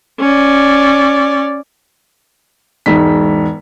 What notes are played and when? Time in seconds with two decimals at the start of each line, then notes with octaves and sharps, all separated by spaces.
0.20 C#4 D5
2.86 E1 G#2 B6